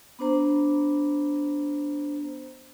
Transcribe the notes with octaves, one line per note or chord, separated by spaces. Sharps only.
B3 D4 C5 A#5